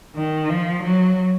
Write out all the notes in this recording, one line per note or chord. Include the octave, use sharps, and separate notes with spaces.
D#3
F3
F#3